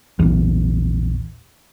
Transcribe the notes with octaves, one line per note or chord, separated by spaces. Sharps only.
A#1 E2